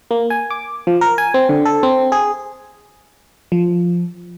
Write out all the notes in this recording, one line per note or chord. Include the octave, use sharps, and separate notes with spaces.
A#3
G#5
D6
F3
A#4
G#5
C4
D3
A4
C4
G#4
F3